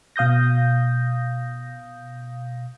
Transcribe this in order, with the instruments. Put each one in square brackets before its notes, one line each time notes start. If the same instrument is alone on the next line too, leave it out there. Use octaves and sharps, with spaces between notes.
[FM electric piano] B2 F5 D#6 G6 A#6